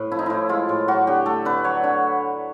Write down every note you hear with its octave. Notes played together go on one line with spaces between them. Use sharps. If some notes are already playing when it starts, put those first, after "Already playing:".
Already playing: A2 B4
F3 E4
D#4
A2 E4
G#3 F4
A2
F#3 F#4
D3 G4
A3 A4
D3 B4
F#3 C#5
D3